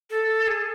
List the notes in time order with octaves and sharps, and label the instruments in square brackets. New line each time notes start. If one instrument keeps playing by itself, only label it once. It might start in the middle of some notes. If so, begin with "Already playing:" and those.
[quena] A4
G#4